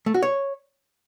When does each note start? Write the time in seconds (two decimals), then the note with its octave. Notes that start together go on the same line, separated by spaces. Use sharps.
0.06 A3
0.14 F#4
0.23 C#5